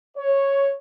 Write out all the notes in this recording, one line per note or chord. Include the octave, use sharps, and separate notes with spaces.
C#5